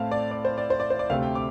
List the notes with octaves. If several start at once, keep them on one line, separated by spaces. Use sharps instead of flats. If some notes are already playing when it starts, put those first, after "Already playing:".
Already playing: A2 A3 C4 F5 A5
D5
D5
C5
D5
C5
D5
C5
D5
D2 C3 A3 C4 F5
G5
D6